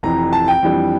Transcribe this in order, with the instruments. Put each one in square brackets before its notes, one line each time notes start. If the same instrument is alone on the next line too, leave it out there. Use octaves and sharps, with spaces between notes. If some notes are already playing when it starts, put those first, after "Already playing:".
[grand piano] F1 F2 E3 A#5
A5
G5
F2 E3 G3 D4